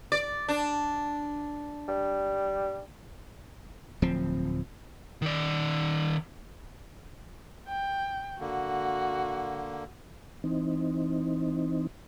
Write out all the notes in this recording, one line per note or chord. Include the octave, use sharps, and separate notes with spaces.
D5
D4
G3
D1 F3 C4
D#3 D5
G5
D3 A#3 F#4
E3 C4 D#4